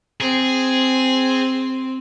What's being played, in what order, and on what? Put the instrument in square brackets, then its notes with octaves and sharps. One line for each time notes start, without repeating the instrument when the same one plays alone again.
[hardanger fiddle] C4 [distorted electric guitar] G#4